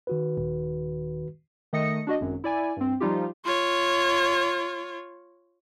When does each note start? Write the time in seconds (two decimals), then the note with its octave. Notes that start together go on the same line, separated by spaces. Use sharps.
0.07 D#3 F#4 B4
0.38 D#1
1.73 D#3 A3 D#5 D#6 A#6 C#7
2.07 D4 F#4 D#5
2.20 G#1 F#2
2.44 E4 D5 G#5
2.77 G2 C4
3.00 F3 G3 D#4 F4 G4
3.45 F4 C#5